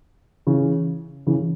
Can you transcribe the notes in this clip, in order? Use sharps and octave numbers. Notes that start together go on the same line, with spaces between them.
C#3 E3
C#3 E3